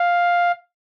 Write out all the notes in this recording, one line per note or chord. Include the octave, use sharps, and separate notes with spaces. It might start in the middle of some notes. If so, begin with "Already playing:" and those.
Already playing: F5